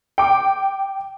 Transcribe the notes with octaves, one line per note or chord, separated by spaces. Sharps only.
G5 D6